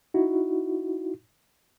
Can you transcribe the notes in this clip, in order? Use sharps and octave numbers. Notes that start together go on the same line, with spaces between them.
D#4 E4 F#4